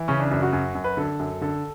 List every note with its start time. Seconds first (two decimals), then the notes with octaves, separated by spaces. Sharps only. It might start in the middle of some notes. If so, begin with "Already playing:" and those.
Already playing: E3
0.08 C#3 C#4
0.20 D4
0.31 F#2 D4
0.42 F#4
0.53 F#2
0.75 F#2
0.84 B4
0.97 D3 A4
1.20 F#2
1.41 D3 A4